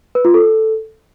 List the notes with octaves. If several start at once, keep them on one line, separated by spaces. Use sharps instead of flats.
B4
F4
A4